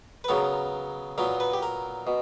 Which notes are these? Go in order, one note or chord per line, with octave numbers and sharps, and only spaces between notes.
B4
C#3 F#3 B3 A#4
A#2 F#3 B3 A#4
B4
G4
A#4
B2